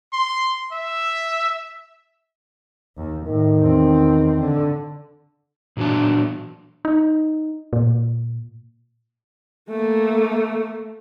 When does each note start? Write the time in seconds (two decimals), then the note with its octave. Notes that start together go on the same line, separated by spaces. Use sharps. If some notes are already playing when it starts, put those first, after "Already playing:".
0.13 C6
0.72 E5
2.97 D#2
3.26 A2 D#3
3.59 E2 C4
4.40 D3
5.77 A#2 E3 F#3 D4 A5
6.85 D#4
7.73 A#2
9.70 A3 A#3